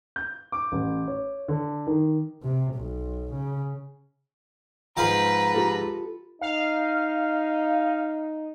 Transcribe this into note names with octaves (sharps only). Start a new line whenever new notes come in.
G6
D6
A1
C#5
D3
D#3
C3
B1
C#3
G#2 F3 B4 F5 A#5
F4 G4 A4
D#4 F5